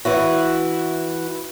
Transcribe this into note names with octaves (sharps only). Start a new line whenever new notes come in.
E3 E4 F#4